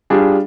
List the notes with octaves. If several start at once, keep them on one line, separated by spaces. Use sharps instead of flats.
G3 D4 F4 G#4